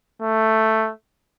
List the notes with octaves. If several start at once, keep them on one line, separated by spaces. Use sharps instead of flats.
A3